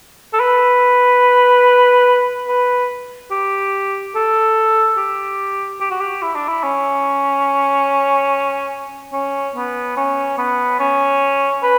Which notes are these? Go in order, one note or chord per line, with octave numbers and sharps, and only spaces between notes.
A4
B4
B4
G4
A4
G4
G4
F#4
G4
E4
D4
E4
C#4
C#4
B3
C#4
B3
C#4
B4